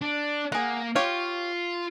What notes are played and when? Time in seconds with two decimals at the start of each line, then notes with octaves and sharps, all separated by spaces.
0.02 D4
0.52 A#3 G#4 F#5
0.96 F4 G4 C#5 F5